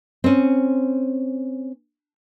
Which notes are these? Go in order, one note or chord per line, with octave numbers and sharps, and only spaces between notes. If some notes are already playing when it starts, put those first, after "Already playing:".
C4 C#4